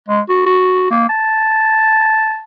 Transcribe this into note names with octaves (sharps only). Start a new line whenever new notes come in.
G#3
F#4
F#4
A#3
A5